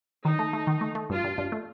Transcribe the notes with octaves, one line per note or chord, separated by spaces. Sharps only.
D#3 D#4
A3
A3
D#3
A3
A3
G2 F4
G2
G2
A3